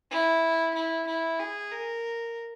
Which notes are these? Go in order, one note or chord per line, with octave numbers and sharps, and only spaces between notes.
E4
E4
E4
G#4
A#4